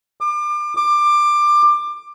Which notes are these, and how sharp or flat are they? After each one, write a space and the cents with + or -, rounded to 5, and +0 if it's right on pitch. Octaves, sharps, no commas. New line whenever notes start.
D6 +30
D6 +20